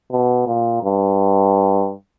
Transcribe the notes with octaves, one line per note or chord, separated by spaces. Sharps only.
B2
A#2
G2